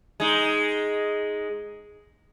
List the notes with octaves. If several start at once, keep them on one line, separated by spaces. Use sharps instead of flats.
G#3 D#4